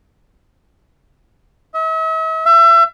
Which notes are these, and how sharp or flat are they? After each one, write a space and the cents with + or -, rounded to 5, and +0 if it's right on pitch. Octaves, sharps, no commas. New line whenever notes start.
E5 -45
E5 +30